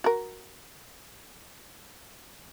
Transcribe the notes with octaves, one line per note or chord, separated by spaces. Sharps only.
F#4 A#4